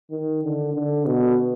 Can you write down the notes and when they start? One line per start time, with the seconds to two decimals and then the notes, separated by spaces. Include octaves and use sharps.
0.11 D#3
0.43 D3
0.74 D3
1.05 B2